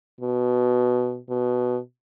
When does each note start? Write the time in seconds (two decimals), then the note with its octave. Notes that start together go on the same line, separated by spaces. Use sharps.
0.21 B2
1.29 B2